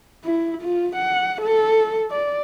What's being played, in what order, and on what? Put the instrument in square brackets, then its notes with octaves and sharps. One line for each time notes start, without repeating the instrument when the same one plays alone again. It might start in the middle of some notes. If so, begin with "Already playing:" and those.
[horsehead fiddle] E4
F4
F#5
A4
D5